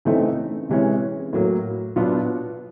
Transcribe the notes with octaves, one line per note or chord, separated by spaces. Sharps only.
C#3 E3 A3 C4 D#4
C3 E3 G#3 C#4
A2 F#3 A#3
B2 F#3 B3 D4 F4